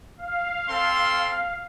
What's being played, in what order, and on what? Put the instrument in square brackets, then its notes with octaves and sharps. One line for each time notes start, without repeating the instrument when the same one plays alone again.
[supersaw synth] F5
[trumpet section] C4 A4 C6